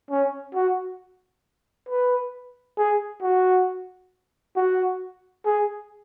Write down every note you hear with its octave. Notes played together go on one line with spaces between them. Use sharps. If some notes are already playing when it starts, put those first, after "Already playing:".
C#4
F#4
B4
G#4
F#4
F#4
G#4